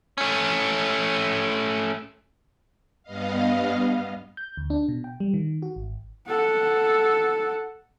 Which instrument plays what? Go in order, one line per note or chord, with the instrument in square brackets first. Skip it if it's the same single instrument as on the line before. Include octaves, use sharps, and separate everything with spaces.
[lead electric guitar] A3 C#4
[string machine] G2 B3 D#5 F5
[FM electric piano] G6
D2
D4
B2
G5
G3
D#3
F#4
G#1
[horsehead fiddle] A4 F#5